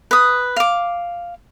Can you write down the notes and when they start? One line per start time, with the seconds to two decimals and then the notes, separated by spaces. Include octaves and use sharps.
0.11 B4 D#6
0.56 F5 D6